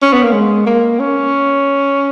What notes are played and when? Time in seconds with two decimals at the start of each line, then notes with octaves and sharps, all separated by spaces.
0.02 C#4
0.13 B3
0.23 A#3
0.33 G#3
0.67 A#3
1.00 C#4